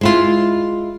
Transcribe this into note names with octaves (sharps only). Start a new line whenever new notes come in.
G#3 E4 F4